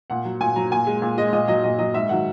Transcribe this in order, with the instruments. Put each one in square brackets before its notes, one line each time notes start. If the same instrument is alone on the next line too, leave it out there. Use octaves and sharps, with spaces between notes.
[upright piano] A#2 F#5
F#3
A#2 G#5
F#3 A#5
A#2 G#5
G#3
A#2
G#3 D#5
A#2 D#5
F#3 D#5
A#2 D#5
F#3 D#5
G#2 E5
D#3 F#3 F#5